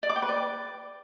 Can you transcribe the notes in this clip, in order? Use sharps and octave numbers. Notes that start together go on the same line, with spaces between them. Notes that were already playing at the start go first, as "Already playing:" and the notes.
D5
D6
G5
B4
D5